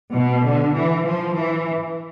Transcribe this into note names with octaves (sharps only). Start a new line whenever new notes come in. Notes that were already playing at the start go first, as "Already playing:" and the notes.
B2
D3
E3
F3
E3